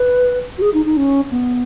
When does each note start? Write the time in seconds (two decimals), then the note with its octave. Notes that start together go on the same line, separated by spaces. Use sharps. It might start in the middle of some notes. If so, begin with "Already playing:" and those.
Already playing: B4
0.58 F#4
0.62 G#4
0.74 D#4
0.85 D#4
0.97 C#4
1.31 B3